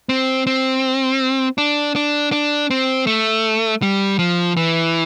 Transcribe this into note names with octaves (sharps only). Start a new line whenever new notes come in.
C4
C4
D4
D4
D4
C4
A3
G3
F3
E3